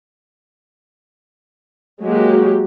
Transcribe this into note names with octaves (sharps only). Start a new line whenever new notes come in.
F#3 G#3 A#3 F#4 G4